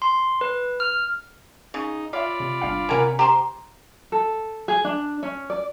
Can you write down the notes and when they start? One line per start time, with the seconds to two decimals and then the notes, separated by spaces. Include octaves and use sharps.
0.02 C6
0.41 B4
0.80 F6
1.74 C#3 D#4
2.13 F4 C#5 D5 E5 F5 B5
2.40 C3
2.62 G1 D4 F5
2.89 C3 C#4 A#4 F#5 G#5
3.19 G4 C5 A#5 C6
4.12 A4
4.68 G#4
4.85 D4
5.23 C#4
5.50 D5